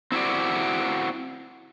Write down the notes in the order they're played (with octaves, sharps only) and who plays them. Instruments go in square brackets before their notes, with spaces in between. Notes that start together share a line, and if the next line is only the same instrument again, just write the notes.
[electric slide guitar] C4 E4 F#4 D5